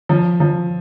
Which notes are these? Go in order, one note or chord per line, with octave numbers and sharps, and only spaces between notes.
F3
F3